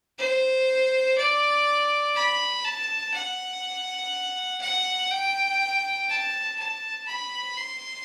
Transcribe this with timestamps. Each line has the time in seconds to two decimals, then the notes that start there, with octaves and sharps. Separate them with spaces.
0.19 C5
1.18 D5
2.15 B5
2.65 A5
3.14 F#5
4.61 F#5
5.11 G5
6.09 A5
6.59 A5
7.07 B5
7.57 C6